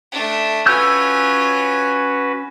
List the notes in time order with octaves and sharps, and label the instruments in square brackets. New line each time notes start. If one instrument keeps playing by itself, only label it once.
[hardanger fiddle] A3 D4
[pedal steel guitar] C#4 E6 G6 [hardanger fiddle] F4 G#5 [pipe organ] F#4 B4